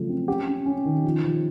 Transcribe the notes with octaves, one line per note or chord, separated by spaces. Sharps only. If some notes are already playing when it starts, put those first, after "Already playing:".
Already playing: C#3 F3 F#3 A3
C4
C#4 G4
C#4
C#4
D#3
F3
F3